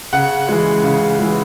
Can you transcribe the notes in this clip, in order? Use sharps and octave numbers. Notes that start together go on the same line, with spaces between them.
C#3 F#5
E3 G#3
C#3
E3 G#3